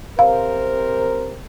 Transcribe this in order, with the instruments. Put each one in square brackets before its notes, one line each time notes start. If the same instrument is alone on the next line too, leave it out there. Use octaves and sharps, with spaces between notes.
[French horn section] C3 A#4 C5 [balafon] F5